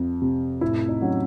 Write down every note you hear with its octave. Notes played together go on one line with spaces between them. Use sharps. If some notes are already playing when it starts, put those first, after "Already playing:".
Already playing: F2
C3
A2 E4
D#4
F#3 C#4